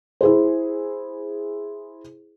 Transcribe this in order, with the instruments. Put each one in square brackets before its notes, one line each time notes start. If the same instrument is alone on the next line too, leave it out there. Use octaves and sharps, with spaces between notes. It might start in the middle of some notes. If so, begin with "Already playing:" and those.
[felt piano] E4 G#4 C5